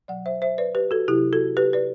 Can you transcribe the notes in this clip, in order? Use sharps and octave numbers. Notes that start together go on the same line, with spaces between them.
B2 F#3 D5 F#5
C5 E5
C5 E5
B4 D5
G4 B4
F#4 A4
C3 F#3 E4 G4
F#4 A4
G4 B4
B4 D5